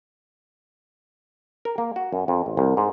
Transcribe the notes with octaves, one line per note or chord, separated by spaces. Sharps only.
A#4
A#3
F#4
F#2
F2
A1
C2
G#2